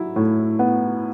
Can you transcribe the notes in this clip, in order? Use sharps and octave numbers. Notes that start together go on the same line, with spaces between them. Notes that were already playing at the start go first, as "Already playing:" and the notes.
Already playing: F#3 E4
A2
B3